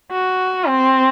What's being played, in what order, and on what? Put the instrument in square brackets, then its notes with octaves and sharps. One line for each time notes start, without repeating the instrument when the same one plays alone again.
[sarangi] F#4
C4